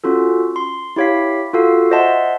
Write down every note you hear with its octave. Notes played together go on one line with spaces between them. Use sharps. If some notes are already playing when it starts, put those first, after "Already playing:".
C#4 F4 F#4 A4
C6
E4 G4 C#5 F5 B6
F4 F#4 A4 F5
C5 D#5 E5 F#5 A5 C6